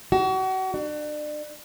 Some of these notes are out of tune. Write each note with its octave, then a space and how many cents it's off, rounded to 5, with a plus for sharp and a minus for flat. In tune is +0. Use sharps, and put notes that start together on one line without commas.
F#4 +35
D4 +35